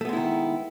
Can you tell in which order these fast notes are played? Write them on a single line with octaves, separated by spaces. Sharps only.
A3 B3 G#3 E4 D#3